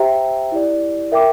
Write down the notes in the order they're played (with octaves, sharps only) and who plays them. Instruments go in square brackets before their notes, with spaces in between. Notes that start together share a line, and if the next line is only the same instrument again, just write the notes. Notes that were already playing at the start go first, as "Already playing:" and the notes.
Already playing: [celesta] G4 C5 E5 G5 A#5
E4 G4 D5
A#4 E5 G5 D6